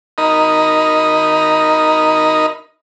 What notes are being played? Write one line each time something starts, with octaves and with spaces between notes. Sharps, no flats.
D#4 A#4 D#5 B5